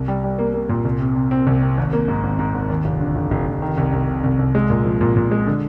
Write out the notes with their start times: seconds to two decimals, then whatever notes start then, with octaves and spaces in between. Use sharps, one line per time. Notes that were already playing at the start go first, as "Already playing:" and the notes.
Already playing: C2
0.08 G3
0.24 G3
0.39 A#3
0.54 A#3
0.69 A#2
0.85 C2
1.00 C3
1.16 C3
1.31 C4
1.47 C2
1.62 C3
1.77 G#1
1.93 A#3
2.08 G#2
2.23 G#1
2.39 G#2
2.54 G#1
2.69 D#2
2.85 F1
3.01 D3
3.16 F1
3.31 F1
3.47 F1
3.62 D#3
3.78 C2
3.93 C2
4.08 C3
4.24 C2
4.39 C2
4.55 G#3
4.70 A#2
4.85 F3
5.01 A#2
5.17 A#2
5.31 G#3
5.47 D3